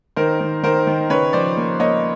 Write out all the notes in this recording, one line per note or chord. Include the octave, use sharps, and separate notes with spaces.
D#3 A#4 C5
D#3
D#3 A#4 C5
D#3
C#3 B4 C#5
F3 C5 D5
A#3
A#3 C#5 D#5